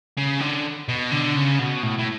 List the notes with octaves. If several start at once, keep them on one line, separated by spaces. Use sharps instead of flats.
C#3
D3
B2
D3
C#3
B2
A2
A2